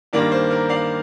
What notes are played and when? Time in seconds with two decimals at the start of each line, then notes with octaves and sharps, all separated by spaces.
0.13 G2 D#3 A#3 D4 A#4 D5
0.32 C5
0.51 A#4
0.69 D5 F5